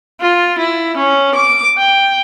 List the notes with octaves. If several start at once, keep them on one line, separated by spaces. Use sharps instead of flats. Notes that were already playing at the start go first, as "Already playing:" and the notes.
F4
E4
C#4
D6
G5